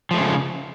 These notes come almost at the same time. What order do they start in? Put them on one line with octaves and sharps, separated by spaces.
F3 A3 G#3 C#3